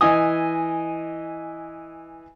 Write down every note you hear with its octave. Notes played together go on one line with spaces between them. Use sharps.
E3 D#5 G#5 D#6